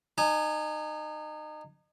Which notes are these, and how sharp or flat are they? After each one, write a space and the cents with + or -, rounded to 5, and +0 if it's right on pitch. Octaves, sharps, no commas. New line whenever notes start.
D#4 -30 G#5 +10